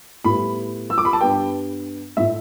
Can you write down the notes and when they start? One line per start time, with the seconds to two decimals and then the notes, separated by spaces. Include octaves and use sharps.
0.24 A2 G3 B3 B5
0.90 E6
0.98 D6
1.05 B5
1.13 A5
1.21 G2 G3 B3 G5
2.17 A2 A3 E5